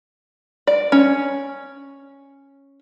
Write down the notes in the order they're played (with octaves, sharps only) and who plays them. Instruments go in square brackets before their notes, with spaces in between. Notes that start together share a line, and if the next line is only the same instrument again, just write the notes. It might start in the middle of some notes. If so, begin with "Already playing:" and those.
[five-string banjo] D5
C#4